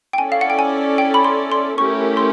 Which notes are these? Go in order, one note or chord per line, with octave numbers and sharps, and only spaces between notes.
G5
C#4 E4 A4 D5 G#5
F5
F#5
G5
G#5
G5
B5
C6
C6
A3 C#4 E4 G4 A#4 C#6
C6